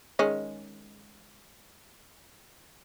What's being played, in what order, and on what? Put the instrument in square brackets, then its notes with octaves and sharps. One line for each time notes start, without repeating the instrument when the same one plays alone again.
[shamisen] D#3 G#3 C#4